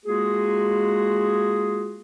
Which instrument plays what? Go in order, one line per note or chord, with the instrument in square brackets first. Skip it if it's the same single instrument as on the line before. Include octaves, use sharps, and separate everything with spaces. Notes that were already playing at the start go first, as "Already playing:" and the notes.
[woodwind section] G#3 A#3 F4 F#4 G#4